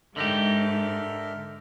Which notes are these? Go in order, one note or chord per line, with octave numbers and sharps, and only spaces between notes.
G#2 D3 D#4 G4 A4 A#4 E5